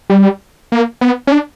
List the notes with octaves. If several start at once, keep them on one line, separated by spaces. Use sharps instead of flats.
G3
A#3
B3
C#4
D4